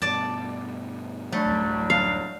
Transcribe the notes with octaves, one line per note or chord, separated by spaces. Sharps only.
G2 B2 D5 A5
F#3 G3 A3 D4
D1 F#2
F5